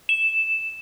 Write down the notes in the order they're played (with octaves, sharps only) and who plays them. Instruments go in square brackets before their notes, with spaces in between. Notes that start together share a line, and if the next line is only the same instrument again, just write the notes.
[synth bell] E7